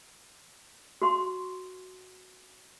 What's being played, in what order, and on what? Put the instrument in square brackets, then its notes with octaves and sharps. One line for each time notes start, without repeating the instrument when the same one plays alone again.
[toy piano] F#4 C6 C#6